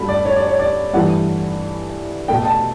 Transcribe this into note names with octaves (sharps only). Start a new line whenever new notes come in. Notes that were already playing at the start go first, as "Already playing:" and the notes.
Already playing: G2 F#3 A3 B5
D5
C#5
D5
C#5
D5
G2 E3 A3 F#5
B2 A3 G5
A5